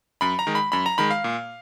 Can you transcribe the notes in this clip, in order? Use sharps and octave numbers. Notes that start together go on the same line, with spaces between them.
F#2 B5
A#5
D#3 G#3
B5
F#2 B5
A#5
D#3 G#3 B5
F5
A#2